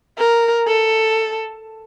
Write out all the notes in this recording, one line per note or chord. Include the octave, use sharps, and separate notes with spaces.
A#4
A4